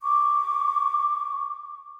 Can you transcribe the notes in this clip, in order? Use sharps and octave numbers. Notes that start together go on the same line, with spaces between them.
C#6 D6